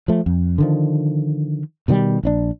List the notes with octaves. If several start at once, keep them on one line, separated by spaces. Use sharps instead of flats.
F3 A3
F2
D3 D#3 F3
B2 D#3 F#3 G3
A#1 C#4 D4